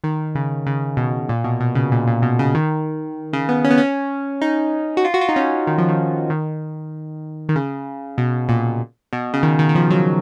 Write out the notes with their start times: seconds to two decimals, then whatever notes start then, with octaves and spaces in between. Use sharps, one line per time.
0.04 D#3
0.35 C#3
0.66 C#3
0.97 B2
1.29 A#2
1.44 B2
1.60 B2
1.75 C#3
1.92 A#2
2.07 A#2
2.22 B2
2.39 C#3
2.55 D#3
3.33 C#3
3.49 B3
3.64 C#4
3.70 B3
3.78 C#4
4.42 D#4
4.97 F#4
5.05 F4
5.14 F#4
5.21 F4
5.29 D#4
5.36 C#4
5.67 D#3
5.78 F3
5.88 D#3
6.30 D#3
7.49 D#3
7.56 C#3
8.18 B2
8.49 A#2
9.13 B2
9.34 C#3
9.43 D#3
9.59 D#3
9.69 D#3
9.75 F3
9.91 F#3